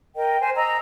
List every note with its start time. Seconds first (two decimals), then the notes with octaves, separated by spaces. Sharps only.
0.17 A#4 D#5 G5
0.41 C5 G#5
0.56 D#5 A#5 E6